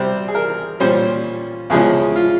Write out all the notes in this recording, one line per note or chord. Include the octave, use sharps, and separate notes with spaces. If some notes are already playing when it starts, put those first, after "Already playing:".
Already playing: C3 G3 C4 C5
G#4
A#4
A#2 G3 C#4 C5
E2 C#3 F3 G#3 C#4 G#4
F4